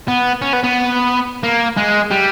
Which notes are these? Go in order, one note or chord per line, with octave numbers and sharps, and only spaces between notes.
B3
C#4
B3
B3
A#3
G#3
G3